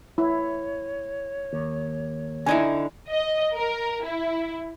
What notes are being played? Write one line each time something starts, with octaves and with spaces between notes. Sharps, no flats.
E4 C#5
D#2
D3 D#4 E4 G#5
D#5
A#4
E4